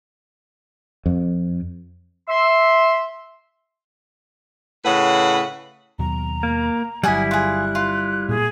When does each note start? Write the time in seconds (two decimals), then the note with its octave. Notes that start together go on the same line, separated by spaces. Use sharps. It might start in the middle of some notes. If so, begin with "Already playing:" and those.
1.06 F2
2.28 E5 C6
4.85 A2 C#3 B4 F#5
5.99 D#2 B2 F#3 A#5
6.43 A#3
7.04 G1 F#3 G3 E4 F#5 G#5 D#6
7.31 F4 G#4 F#6
7.75 F4
8.29 A#2 A#3 G#4